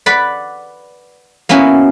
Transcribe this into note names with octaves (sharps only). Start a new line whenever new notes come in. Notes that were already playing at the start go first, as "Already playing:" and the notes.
B4 D5 F#5 B5
A#3 B3 C#4 E4 F#4